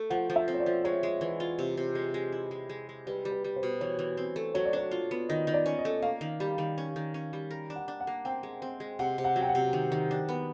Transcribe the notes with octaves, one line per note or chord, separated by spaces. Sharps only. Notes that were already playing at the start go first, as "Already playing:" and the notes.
Already playing: A3
F3 F#5
F3
E5
C4
C#5
D5
F3
G#3 C#5
G#3
E3
F4
C3
C3
G#3
G#3
E4
G#3
G#3
G#3
G3 B4
G3
B4
G3
C5
B2
E3 C#5
E3
C4
A3
F#3 C#5
D5
D4 C#5
F4
B3
D#3 D#5
D#3
D5
C#4
D#5
A3
A#3 F5
D#3
G3
D#3
C#4
D#3
C#4
G3
A#4
D4
F#5
D4
F#5
A#3
C4 G5
G#3
C4
G#3
C3 F#5
C3
F#5
F#3
G5
F#5
C3
D#3
D#3
D4
B3